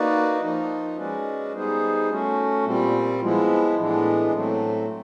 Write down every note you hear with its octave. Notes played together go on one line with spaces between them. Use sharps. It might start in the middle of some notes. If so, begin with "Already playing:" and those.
Already playing: A#3 D#4 F#4 B4 D5
F3 A#3 D#4
G#3 C#4 F#4 B4 D5
G3 B3 D#4 G#4 C5
A3 C#4 F#4
A#2 G3 C4
F3 G#3 B3 E4
A2 E3 G#3 B3 D4
A2 F#3 A3 C4